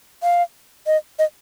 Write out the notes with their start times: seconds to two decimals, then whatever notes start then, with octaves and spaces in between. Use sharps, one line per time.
0.23 F5
0.87 D#5
1.19 D#5